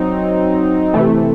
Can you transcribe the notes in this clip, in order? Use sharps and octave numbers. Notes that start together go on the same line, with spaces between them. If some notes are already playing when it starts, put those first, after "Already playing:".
Already playing: F#3 C4 D#4
C3 E3 A3